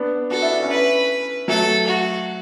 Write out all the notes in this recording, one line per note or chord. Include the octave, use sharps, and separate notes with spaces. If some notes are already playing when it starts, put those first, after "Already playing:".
Already playing: B3 D4
F#4 A4
E4
D4
C#4 E4
B4
F#3 A3 A4
F#4